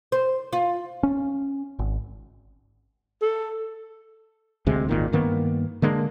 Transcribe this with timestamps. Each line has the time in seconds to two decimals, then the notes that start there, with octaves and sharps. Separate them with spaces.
0.12 C5
0.53 F4
1.03 C#4
1.79 G#1
3.22 A4
4.67 D2 C3 G#3
4.89 G#1 A#2 D#3
5.12 G2 D#3 A#3 B3
5.82 D3 G#3 A#3 D4